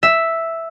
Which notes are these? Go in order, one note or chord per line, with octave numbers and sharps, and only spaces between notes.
E5